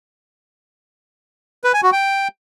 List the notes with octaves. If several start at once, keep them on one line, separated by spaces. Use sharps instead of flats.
B4
G#5
F#4
G5